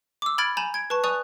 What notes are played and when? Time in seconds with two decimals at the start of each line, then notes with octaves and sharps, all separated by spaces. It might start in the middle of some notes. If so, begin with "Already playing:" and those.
0.22 D6 E6
0.38 B5 F6 G#6 A6 D7
0.57 G#5 A#5 B5 G6 E7
0.74 G#6 D7
0.90 B4 A5 C#6
1.04 D5 G#5 C#6 D#6 F#6 F7